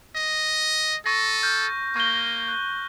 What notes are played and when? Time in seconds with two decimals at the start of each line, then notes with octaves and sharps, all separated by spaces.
0.16 D#5
1.06 A4 C#6 A#6
1.43 F6 G6
1.96 A#3 C#6 G6 G7
2.48 F#6